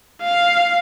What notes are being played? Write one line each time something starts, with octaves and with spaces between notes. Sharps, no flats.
F5